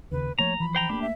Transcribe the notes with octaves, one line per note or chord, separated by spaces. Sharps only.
D#2 C#3 B4
F3 A3 A#3 C#5 A#5
E3 F3 B5
C5 G5 A#5
A3 A#3 D4 G4
E5